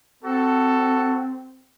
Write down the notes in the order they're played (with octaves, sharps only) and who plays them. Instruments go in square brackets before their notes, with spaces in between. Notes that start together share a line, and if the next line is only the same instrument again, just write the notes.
[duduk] C4 [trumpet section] F#4 A4